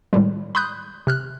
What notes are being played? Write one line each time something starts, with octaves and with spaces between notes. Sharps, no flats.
A2 D#3 G3 G#3
B5 C6 D#6 F#6 G6
C3 F6 F#6